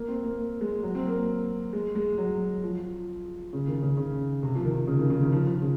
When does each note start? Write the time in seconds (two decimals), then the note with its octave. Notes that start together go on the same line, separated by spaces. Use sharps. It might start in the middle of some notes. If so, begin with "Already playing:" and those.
Already playing: A#3
0.08 C4
0.23 A#3
0.61 G#3
0.83 F#3
0.95 C4
1.06 A#3
1.73 G#3
1.95 G#3
2.18 F#3
2.63 F3
3.53 C#3
3.68 D#3
3.82 C#3
3.97 C#3
4.43 C3
4.55 F3
4.65 D#3
4.87 C#3
4.99 D#3
5.10 C#3
5.20 D#3
5.32 F3
5.47 F3
5.62 C#3